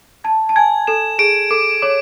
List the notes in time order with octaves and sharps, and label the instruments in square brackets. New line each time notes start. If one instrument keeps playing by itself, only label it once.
[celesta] A5 [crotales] G#6
[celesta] A5
[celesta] G#5 [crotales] G#6
[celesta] A4 [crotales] E7
[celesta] G#4 [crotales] D7
[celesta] A4 [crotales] D6
[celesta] C#5 [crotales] D6